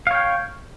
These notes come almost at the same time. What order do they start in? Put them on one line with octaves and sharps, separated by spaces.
F5 C#5 G5